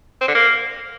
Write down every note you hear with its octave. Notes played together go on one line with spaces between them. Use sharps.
C4
D3
A#3